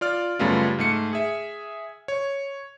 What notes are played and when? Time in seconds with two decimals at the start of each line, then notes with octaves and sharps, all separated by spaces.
0.01 F4 D5 F6
0.39 F#2 C#3 G3 A3 B3 F4
0.78 G#2 A3 C#7
1.13 G#4 E5
2.08 C#5